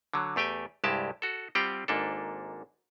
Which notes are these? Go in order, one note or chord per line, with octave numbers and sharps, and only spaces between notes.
D3 F#3
E2 A3 G4 G5 G#5
C2 G2 G#3 E4 G4 A5
F#4 A4
G3 C4 F4 G4 F#5 G5
G#1 G#2 A#3 D4 A4